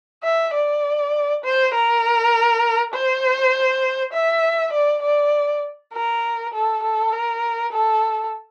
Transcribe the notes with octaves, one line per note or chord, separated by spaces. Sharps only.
E5
D5
C5
A#4
C5
E5
D5
D5
A#4
A4
A4
A#4
A4